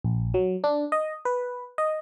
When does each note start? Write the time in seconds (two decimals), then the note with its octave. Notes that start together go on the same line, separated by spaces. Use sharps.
0.04 A#1
0.34 F#3
0.64 D4
0.92 D#5
1.25 B4
1.78 D#5